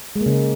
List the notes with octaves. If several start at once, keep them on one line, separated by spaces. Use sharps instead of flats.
G#3
A#3
C#3